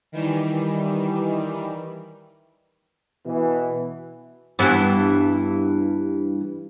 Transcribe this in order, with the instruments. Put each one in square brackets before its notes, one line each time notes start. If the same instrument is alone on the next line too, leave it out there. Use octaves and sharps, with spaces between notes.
[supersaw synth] D#3 E3 G3
[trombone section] B2 E3
[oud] G2 E3 B3